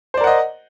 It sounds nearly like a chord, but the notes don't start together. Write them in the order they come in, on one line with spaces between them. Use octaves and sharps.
C5 D5 A#4 F#5 D#5